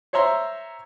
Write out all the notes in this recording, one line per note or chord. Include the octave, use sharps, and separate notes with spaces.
C5 C#5 E5 A#5 C6